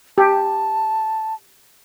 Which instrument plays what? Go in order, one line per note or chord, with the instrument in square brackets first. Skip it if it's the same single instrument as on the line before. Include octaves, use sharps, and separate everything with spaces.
[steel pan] G4 [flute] A5